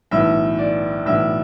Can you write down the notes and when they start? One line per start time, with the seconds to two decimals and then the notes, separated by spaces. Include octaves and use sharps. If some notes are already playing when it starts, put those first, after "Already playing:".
0.11 B1 A2 E3 E5
0.59 D5
1.05 B1 A2 E3 E5